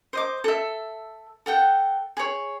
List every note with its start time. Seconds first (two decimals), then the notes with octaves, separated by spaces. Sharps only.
0.13 C5 D#5 D6
0.44 A4 E5
1.46 A4 F#5 G5
2.17 G#4 C#5